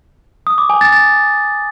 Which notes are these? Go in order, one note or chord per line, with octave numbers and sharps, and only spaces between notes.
D#6
D6
G#5
A6
A6